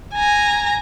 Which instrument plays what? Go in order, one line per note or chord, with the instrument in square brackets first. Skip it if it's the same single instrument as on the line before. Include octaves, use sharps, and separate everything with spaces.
[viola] G#5 A#5